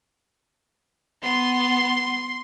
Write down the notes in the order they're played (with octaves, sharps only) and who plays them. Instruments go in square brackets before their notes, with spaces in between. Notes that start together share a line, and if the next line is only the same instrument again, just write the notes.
[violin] B3 [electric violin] C6